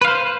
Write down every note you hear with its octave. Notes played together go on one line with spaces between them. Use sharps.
B4 C5 F5